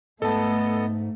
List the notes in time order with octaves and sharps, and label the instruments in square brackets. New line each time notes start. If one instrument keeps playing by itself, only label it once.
[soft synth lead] G#2 [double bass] A3 [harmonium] B3 D#5 [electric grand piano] A4 A5